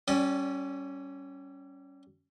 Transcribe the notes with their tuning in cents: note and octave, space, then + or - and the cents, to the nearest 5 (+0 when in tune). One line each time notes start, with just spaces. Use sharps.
G3 -25 C#4 +0 D5 +0